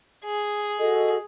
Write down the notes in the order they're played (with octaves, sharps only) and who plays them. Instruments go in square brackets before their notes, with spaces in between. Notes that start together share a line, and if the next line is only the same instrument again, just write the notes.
[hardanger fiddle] G#4
[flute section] F#4 A4 D#5